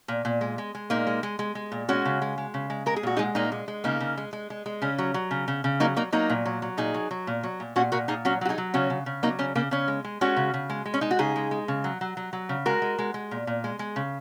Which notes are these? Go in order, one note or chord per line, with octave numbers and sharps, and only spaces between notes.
A#2
A#2
G#3
G#3
G#3
A#2 A#3 D#4
G#3
G#3
G#3
G#3
A#2
G#3 C#4 F#4
C#3
G#3
G#3
C#3
G#3
G#3 A#4
G#4
A#2 F#4
G#3 D#4 G#4
A#2 A#3 D#4
G#3
G#3
C#3 A#3 D#4
C#3
G#3
G#3
G#3
G#3
C#3 C#4
F#3
F#3
C#3
C#3
C#3
F#3 A#3 D#4
F#3 A#3 D#4
F#3 A#3 D#4
A#2
F#3
F#3
A#2 D#4 G#4
F#3
F#3
A#2
F#3
A#2
A#2 C#4 F#4
A#2 F#4 A#4
A#2 D#4 G#4
F#3 C#4 F#4
F#3 F#4
D#4 G#4
F#3
C#3 C#4 F#4
C#3
C#3
F#3 A#3 D#4
C#3 C#4
C#3 A#3
C#3 C#4
G#3
G#3
G#3 C#4 F#4
C#3
C#3
G#3
G#3
C#4
G#3 D#4
F#4
C#3 D#4 G#4
G#3
G#3
C#3
F#3
F#3
F#3
F#3
C#3
G#3 F#4 A#4
G#3
G#3
G#3
A#2
A#2
G#3
G#3
C#3